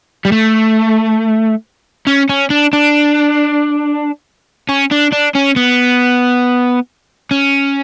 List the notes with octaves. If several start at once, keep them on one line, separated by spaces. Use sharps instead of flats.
G3
A3
C#4
C#4
D4
D4
C#4
D4
D4
C#4
B3
C#4